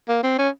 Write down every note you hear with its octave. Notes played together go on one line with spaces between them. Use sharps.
A#3
C4
C#4